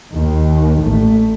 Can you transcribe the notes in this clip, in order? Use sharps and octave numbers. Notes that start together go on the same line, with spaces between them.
D#2 D#3
A1 A3